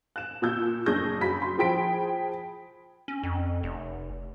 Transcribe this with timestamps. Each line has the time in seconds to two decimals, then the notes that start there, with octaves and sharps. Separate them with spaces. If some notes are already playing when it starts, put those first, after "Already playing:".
0.16 F#6 E7
0.42 A#2 E6 G6
0.86 F#1 D4 G#4 C#6 G6 A#6
1.21 F#2 B5 B6
1.42 C6
1.58 F3 G#4 G5 B5 B6 D7
3.08 C#4
3.23 F2
3.63 F1